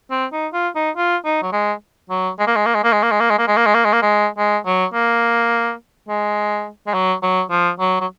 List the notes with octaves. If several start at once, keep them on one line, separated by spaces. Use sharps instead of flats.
C4
D#4
F4
D#4
F4
D#4
F#3
G#3
F#3
G#3
A#3
G#3
A#3
G#3
A#3
G#3
A#3
G#3
A#3
G#3
A#3
G#3
A#3
G#3
A#3
G#3
A#3
G#3
G#3
F#3
A#3
G#3
G#3
F#3
F#3
F3
F#3
F#3